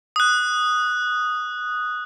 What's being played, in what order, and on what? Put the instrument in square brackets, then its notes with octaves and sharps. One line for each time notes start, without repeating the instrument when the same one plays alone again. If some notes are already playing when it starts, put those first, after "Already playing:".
[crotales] D#6 F#6